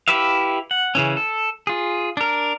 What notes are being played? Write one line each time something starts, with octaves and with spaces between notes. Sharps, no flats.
E4 G4 B4 E5 F5
F#5
C#3 E3 C#4
A4
F4 G#4
D4 A#4